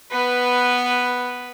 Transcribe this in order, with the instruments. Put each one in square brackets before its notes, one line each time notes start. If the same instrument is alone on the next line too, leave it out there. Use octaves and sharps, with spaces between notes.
[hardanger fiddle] B3 B4